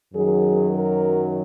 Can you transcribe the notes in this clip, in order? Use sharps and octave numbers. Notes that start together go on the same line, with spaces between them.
F#2 D#3 F#3 G#4
A#4